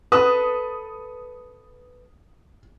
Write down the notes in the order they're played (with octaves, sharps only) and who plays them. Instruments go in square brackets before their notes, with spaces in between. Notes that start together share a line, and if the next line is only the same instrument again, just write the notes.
[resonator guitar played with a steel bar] A4 B4 [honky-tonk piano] D#6